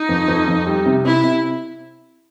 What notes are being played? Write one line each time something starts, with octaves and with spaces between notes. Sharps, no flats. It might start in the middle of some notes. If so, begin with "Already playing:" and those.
Already playing: D#4
F2
F2
F2
G3
C3
C3 E4
C3